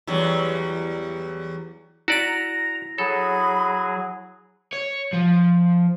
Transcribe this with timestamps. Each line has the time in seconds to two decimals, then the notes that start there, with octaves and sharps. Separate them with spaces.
0.07 E2 F#3 G3
2.08 E4 F#4 D5 A#5 A#6
2.98 F#3 G#4 A4 B5
4.73 C#5
5.13 F3